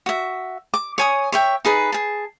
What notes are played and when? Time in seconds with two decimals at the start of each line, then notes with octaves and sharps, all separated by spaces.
0.06 F#4 E5
0.74 D6
0.98 C#5 G#5 D#6
1.32 C#5 E5 G5
1.65 D#4 G#4 B4 A5
1.92 G#4 A5